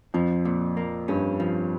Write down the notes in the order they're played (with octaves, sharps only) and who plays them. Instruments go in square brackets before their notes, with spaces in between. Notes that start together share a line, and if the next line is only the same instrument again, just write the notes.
[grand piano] F2 [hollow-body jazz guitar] F3
[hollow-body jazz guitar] A#2
A#3
[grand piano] G2 [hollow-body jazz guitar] C#4
[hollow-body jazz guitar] F3